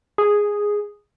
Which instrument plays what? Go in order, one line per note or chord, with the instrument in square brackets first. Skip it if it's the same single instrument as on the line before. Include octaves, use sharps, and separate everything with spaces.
[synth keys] G#4